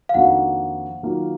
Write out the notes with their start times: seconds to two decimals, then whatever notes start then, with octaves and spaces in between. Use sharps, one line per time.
0.09 F5
0.14 F2 D#3 A#3 D4 F#4 F#5
1.03 D#3 F#3 A#3 F4